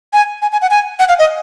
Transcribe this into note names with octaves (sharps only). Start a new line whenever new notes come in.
G#5
G#5
G#5
F#5
G#5
F#5
F5
D#5